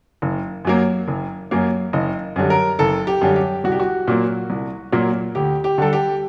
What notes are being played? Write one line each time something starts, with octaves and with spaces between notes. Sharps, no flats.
F#1
F#2 F#3 A#3
F#1
F#2 F#3 A#3
F#1 D#5
F#2 D3 G3
A#4
F#1 A4
G4
F#2 D3 G3
G4
C2 F#4
G4
F#4
A#2 F#3 A#3
C2
A#2 F#3 A#3
D2 G4
G4
D3 G3 A4
G4